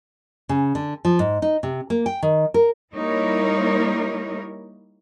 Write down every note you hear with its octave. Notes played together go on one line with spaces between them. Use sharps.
C#3
D3
F3
G#2
D#4
C3
A#3
G5
D#3
A#4
G3 A#3 D#4 E4 A#4 C#5